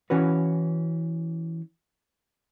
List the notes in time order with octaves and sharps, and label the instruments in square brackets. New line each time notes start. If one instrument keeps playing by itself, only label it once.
[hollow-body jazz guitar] E3 C#4 F#4 B4